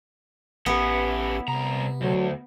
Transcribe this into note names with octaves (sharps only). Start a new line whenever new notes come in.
A1 E3 B3 C#4 G4
C2 C3 A#5
D2 F#3